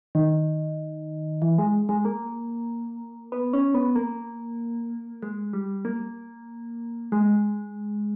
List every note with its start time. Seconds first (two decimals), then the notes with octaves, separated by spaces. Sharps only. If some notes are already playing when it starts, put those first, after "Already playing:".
0.15 D#3
1.42 E3
1.58 G#3
1.89 G#3
2.05 A#3
3.32 B3
3.53 C#4
3.74 B3
3.96 A#3
5.23 G#3
5.53 G3
5.85 A#3
7.12 G#3